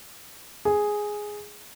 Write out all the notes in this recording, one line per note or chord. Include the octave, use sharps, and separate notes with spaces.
G#4